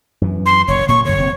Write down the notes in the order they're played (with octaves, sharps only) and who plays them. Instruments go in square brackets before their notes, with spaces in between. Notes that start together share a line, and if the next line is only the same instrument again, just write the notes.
[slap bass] F#2 E3
[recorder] C6
[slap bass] F#1 A#2 [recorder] C#5
[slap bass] A#2 A3 A#3 [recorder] C#6
[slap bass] F#2 D3 [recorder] C#5
[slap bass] F1 C#3 C4